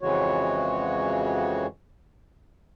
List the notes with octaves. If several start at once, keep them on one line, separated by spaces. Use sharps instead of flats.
F2 C#3 E3 G#3 F#4 C#5